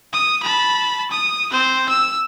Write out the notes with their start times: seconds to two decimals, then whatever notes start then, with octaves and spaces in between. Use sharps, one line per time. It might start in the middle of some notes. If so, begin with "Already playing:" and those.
0.13 D#6
0.43 A5 B5
1.11 D#6
1.52 C4 C5
1.89 E6